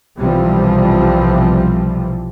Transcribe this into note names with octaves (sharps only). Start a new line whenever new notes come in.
B1 C3 E3 F3 G3 C4